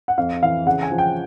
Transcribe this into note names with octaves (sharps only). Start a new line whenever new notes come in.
F#5
F2 F5
E3 F5
C#3 F#5
G#5
F3
G5